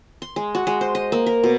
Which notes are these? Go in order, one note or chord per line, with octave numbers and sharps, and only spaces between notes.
C6
G#3
F#4
G#3
C5
D#5
A#3
A#4
B2